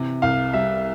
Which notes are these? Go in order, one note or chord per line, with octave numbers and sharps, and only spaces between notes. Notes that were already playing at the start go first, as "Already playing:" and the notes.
Already playing: C3 E3
C2 F5
G3 E5